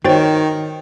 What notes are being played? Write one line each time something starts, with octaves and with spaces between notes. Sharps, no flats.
D#3 F#4 C5 C#5 G5 A6